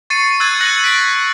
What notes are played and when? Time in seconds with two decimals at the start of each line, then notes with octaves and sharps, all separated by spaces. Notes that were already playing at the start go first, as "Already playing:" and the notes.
0.10 C#6 A6 C7 C#7 D#7
0.40 E6 F#6 G#6 A6 D#7
0.61 F#6 A#6 C#7 D#7 F#7
0.84 B6 D7